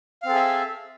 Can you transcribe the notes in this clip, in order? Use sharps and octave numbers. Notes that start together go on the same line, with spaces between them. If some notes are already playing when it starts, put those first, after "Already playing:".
C4 G#4 A4 E5 F5